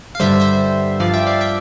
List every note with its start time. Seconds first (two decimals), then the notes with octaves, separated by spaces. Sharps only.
0.15 F5
0.20 G2 D3 G3 C5 E5
0.40 C5 E5
1.00 G2 F3 D5 F5
1.14 E5 G5
1.27 D5 F5
1.41 E5 G5